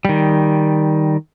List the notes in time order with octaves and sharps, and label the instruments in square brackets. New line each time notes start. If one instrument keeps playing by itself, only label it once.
[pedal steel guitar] D#3 G3